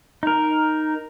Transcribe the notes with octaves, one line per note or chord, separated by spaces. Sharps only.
D#4 A#4